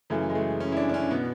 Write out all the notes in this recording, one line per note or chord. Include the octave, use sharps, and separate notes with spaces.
F#2 C#3 E3 A3
G#3
A3
C#4
E4
D4
D4
C#4
B2 B3